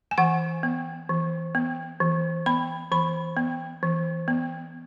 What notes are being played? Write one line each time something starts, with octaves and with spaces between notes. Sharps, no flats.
G#5
E3 F#5
B3
E3
B3
E3
B3 B5
E3 B5
B3
E3
B3